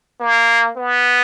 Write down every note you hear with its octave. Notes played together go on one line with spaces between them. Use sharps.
A#3
B3